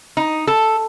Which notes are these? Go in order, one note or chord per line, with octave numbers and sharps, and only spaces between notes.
D#4
A4